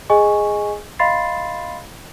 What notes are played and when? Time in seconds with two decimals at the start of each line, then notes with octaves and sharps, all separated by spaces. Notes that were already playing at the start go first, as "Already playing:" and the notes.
0.10 G#4 D#5 G#5 C#6
0.99 D#5 F5 B5 C6 A6 C7